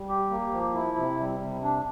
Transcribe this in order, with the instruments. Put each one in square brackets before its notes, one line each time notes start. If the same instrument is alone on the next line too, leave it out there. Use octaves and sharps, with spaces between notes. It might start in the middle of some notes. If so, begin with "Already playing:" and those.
Already playing: [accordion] G3
G4
A#3
F3
E4
C3
G3
C3
D4